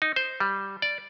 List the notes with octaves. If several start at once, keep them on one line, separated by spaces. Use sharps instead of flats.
D#4
C5
G3
D5